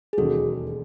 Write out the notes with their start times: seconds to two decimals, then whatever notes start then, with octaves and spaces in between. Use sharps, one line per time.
0.13 G#4
0.17 E1 D#2 D#3 F#3 C#4 F#4 A4